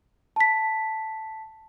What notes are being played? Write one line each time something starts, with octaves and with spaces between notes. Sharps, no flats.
A5 B6